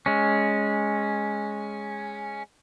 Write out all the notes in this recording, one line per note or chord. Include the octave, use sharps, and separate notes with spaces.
G#3 C#4